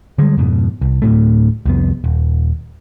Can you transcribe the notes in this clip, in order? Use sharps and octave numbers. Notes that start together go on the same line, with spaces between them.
D3 G3 G#3
F2 G#2 B2
C2
D2 A2 A3
C2 F2 B3
D#1